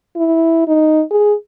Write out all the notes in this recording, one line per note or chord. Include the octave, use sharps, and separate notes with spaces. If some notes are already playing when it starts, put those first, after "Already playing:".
E4
D#4
G#4